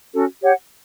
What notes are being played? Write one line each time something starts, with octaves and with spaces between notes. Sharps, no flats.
C#4 F#4 A4
G4 C#5 F#5